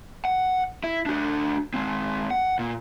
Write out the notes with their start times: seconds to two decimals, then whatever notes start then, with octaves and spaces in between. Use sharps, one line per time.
0.25 F#5
0.84 E4
1.06 D4 F#4
1.74 G#3 C4
2.31 F#5
2.59 A#2